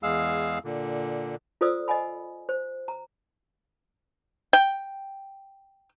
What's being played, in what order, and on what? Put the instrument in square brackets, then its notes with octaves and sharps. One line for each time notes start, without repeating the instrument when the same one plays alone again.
[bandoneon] E2 G#3 G#4 F5 E6
A#2 D3
[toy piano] F4 A4 C5 D5 D#6 E6
D#5 F#5 G#5 B5
C5
A#5
[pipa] G5